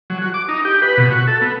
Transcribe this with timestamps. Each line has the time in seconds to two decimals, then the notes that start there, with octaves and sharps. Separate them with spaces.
0.10 F#3
0.22 F#4
0.34 D6
0.49 D#4
0.65 G4
0.82 B4
0.98 B2
1.11 F#4
1.27 A4
1.41 B3